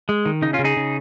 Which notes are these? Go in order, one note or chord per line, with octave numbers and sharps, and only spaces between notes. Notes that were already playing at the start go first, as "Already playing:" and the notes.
G#3
D#3
C#3 D#4
C#4 F4
C#3
D#4 G#4
C#3